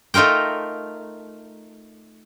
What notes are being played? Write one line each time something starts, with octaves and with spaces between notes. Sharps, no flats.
A3 D#4 F4 A#4 G5